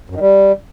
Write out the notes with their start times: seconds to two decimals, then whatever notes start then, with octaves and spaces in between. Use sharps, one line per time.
0.10 F#2
0.15 D#3
0.20 G3